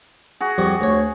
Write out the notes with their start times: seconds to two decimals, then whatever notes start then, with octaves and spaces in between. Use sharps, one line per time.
0.40 F#4 G#4
0.58 F2 G3 C#6
0.81 D2 C#5